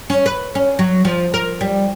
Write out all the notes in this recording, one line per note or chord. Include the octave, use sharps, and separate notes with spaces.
C#4
B4
C#4
F#3
F3
A#4
G3